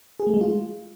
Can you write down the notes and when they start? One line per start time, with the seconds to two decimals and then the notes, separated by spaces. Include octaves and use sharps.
0.20 G#4
0.27 A3
0.34 G#3
0.41 F4